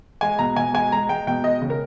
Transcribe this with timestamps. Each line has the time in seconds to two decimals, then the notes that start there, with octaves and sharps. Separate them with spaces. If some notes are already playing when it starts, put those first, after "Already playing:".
0.21 G#3 G#5
0.39 B2 A#5
0.56 B2 G#5
0.74 G#3 G#5
0.92 G#3 A#5
1.09 G#3 G5
1.27 B2 G5
1.44 G#3 D#5
1.61 C#3
1.70 A#4